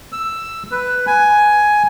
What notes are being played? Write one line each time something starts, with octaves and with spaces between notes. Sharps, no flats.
E6
B4
G#5